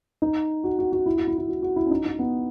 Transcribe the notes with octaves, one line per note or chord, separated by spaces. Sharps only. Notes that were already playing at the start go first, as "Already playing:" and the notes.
D#4
F#4
F#4
F#4
E4
F#4
E4
E4
F#4
F#4
E4
C#4
D#4
D#4
B3